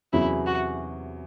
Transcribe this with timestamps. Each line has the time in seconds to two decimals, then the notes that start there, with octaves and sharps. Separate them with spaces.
0.13 E2 C3 F#3 C#4 E4 G#4
0.47 F#4